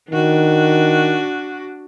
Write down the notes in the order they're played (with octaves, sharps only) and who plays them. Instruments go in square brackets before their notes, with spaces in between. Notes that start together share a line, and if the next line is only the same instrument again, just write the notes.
[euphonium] D#3 [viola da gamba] D4 F#4